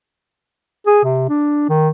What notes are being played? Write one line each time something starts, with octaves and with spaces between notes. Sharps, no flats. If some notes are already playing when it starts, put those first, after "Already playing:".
G#4
C3
D4
D#3